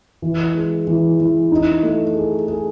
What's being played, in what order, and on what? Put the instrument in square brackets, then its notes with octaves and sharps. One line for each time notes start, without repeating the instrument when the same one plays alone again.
[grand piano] E3
G#3
E3
E3
D#4
A3
G#4
G#4